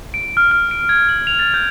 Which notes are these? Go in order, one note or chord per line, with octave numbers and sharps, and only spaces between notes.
D7
F6
F6
D7
G#6
F#7
F7
A6
G6